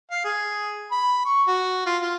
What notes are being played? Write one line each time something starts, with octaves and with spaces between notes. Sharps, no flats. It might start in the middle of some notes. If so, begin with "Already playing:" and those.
F5
G#4
B5
C#6
F#4
F4
F4